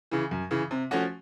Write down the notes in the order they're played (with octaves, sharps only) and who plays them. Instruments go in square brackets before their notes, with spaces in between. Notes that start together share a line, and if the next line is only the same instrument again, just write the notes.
[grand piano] C#3 E3
F#2
C#3 E3
C3
F3 A3 C#4 F#4